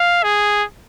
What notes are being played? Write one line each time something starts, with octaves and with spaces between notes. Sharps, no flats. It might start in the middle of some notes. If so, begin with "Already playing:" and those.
Already playing: F5
G#4